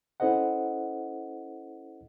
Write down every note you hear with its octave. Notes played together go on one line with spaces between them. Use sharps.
C#4 E4 A4 C5 D#5 F#5